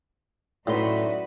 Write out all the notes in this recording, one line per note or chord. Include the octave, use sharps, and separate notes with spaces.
F#2 A2 D#4 E4 F#4 B4 D5 C6